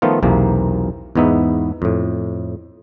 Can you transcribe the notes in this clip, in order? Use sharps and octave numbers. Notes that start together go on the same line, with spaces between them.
D#3 F3 A3 B3 D#4 F4
B1 E2 C3 A#3
E2 G#2 B3 D#4 E5
F2 A2